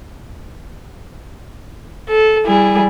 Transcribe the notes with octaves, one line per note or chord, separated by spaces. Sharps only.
A4
G3 E4 G#4